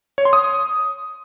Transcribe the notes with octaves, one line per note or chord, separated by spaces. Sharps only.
C#5
C6
D#6